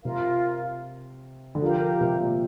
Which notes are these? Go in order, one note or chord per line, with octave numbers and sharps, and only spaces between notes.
C3 F4 A#4 F5
D3
F3 G4 A#4 F5 A#5
F3
C3
A#2